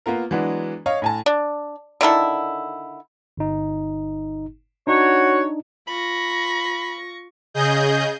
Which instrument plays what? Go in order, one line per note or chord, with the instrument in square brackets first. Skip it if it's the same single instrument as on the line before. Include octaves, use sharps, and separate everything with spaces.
[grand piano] A#3 B3 F4 A#4
E3 F#3 G#3 B3 D4
C#5 D#5 F5
A2 G#5 A5
[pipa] D4
D3 D#3 E4 A4
[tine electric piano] G1 D#4
[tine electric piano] D4 D#4 [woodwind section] F#4 C#5
[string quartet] F4 C#6 A#6 [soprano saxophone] B5
[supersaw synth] C#3 G#4 D#5 G6